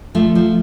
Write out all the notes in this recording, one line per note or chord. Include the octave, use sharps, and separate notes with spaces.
F3 A3
F3